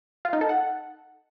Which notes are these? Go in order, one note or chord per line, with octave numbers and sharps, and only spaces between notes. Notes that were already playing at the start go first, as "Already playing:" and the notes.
F4
D#4
A4
F#5